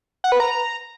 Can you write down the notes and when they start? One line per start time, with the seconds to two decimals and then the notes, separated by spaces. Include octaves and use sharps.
0.24 F#5
0.32 B4
0.40 A#5